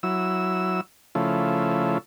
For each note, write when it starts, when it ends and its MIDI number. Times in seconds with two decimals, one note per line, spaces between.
0.03 0.81 54
0.03 0.81 64
0.03 0.81 88
1.15 1.98 49
1.15 1.98 53
1.15 1.98 57
1.15 1.98 64